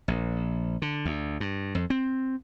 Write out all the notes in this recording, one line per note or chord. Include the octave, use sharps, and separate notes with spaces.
A#1
D3
D2
G2
F2
C4